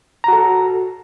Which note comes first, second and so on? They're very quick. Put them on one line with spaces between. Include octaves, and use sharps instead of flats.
A#5 F#4 A4